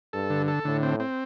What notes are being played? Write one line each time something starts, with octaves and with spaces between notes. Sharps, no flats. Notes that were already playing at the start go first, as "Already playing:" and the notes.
G2 A4
D3
A4
A2 D3
C4
C4